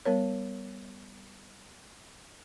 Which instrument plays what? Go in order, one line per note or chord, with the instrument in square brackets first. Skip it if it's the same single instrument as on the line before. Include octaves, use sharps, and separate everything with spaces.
[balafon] G3 B3 A#4 C#5